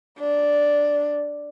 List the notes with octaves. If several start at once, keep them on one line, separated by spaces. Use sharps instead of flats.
D4